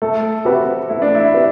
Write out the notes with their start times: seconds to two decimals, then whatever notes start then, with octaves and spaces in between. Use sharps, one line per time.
0.02 A3 A4
0.45 C4 F#4 G4 B4 E5
0.89 A3 E4
1.02 D4
1.15 E4
1.34 C4 G4 B4 E5